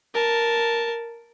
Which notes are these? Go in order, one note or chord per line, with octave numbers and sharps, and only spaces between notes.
A#4 A5